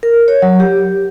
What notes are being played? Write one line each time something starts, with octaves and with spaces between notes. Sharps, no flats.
A#4
C#5
F#3
G4